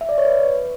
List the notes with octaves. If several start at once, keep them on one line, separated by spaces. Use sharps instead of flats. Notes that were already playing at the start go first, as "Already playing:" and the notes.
E5
D5
C#5
B4